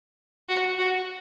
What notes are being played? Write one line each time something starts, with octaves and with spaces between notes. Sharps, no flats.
F#4
F#4